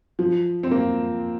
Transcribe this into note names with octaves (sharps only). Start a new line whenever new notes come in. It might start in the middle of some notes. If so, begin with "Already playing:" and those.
F3
C4
A#3